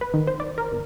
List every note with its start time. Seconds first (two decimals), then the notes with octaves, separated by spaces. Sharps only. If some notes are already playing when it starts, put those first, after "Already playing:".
0.01 B4
0.14 D#3
0.27 C5
0.40 D5
0.58 A#4
0.72 G1